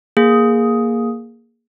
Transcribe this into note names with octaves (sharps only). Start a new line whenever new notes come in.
A#3 G#4